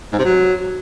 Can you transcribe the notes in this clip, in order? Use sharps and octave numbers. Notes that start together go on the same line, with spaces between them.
G#2
C3
F#3